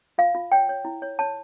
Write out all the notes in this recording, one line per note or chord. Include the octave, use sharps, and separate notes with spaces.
F4 F5
F4
C#5 G5
C#5
E4
C#5
C#5 A5